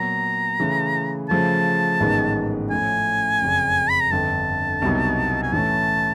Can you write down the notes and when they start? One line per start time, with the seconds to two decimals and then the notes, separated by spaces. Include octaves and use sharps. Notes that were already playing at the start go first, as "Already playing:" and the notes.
Already playing: A#2 F#3 B3 A#5
0.60 C#3 E3 A3
1.29 C#3 F3 A3 A5
2.00 A1 G#2 D#3 G#3 B3
2.70 A2 F3 A3 C#4 G#5
3.41 F#1 F2 C#3
3.90 B5
4.01 A#5
4.11 G1 F2 D3 A5
4.82 C2 B2 F#3 B3 D#4
5.43 G#5
5.52 A2 E3 A3 C#4 A5